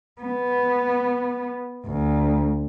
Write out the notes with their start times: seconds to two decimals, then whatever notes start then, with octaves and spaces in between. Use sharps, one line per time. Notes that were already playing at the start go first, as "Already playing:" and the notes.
0.22 B3
1.86 D2